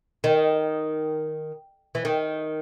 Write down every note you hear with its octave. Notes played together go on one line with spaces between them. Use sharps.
D#3
E3
D#3